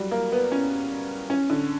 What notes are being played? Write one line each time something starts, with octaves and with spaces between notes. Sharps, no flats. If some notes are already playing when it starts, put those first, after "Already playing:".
Already playing: F#3 G3
A#3
B3
C#4
C#4
D3